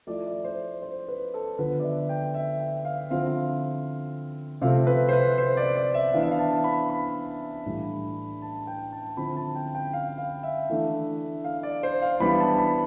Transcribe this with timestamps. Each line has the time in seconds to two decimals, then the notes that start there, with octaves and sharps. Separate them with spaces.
0.07 F3 A3 E4 D5
0.26 D5
0.44 C5
0.82 C5
1.08 B4
1.34 A4
1.58 D3 F3 B3 B4
1.80 D5
1.83 E5
2.09 G5
2.34 E5
2.60 G5
2.85 F5
3.10 D3 F3 C4 E4 F5
4.62 C3 F3 A3 C4 F5
4.87 B4
5.09 C5
5.13 B4
5.38 C5
5.57 D5
5.76 D5
5.94 E5
6.13 E3 B3 D4 F5
6.23 E5
6.31 F5
6.39 A5
6.64 B5
6.90 B5
7.66 A2 E3 G3 D4
8.42 A5
8.67 G5
8.92 A5
9.17 D3 F3 C4 E4 B5
9.37 A5
9.55 G5
9.75 G5
9.93 F5
10.18 F5
10.43 E5
10.70 E3 A3 D4
11.44 F5
11.63 D5
11.83 C5
12.02 F5
12.20 E3 G3 B3 D4 B5
12.40 A5
12.58 B5